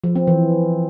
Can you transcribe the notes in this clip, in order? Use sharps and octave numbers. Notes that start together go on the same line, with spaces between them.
F3
C4
E3